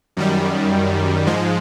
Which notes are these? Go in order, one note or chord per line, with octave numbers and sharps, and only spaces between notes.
F#2 D#3 G3
G#2 F3 G#3